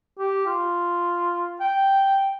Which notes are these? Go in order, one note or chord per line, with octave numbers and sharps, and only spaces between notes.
G4
F4
G5